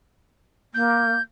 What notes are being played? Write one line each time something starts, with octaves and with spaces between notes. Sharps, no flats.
A#3 G6